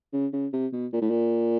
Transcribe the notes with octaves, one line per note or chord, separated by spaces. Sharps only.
C#3
C#3
C3
B2
A#2
A2
A#2